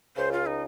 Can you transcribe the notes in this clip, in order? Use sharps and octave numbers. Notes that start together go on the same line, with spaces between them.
C#2 C#3 C5
F4
D#4